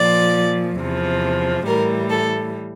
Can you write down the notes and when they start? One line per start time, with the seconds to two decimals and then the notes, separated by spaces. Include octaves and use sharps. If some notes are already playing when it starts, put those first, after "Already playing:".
Already playing: A#2 F3 D5
0.78 E2 C3 F3
1.65 A2 E3 G3 A#4
2.10 A4